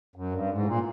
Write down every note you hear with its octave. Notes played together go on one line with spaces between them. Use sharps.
F#2
G2
G#2
A2
A#2